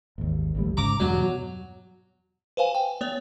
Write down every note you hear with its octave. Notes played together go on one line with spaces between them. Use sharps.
G#1 D#2
A1 D2 G3
G#2 C#3 A#5 D6
E2 G2 B2 F#3
B4 C5 F5 G#5
G5
B3 C#5